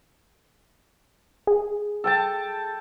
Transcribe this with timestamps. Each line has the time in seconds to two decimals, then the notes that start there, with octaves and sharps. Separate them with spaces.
1.47 G#4
2.04 A4 G5 A5